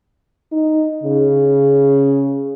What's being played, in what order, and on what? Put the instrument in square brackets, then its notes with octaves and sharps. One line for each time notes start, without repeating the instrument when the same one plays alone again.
[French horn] D#4
C#3